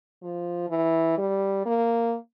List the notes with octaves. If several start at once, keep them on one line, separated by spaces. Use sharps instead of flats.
F3
E3
G3
A#3